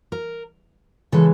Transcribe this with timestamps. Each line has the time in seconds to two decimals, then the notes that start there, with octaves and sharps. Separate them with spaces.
0.12 A#4
1.12 C#3 E3 G#3 A4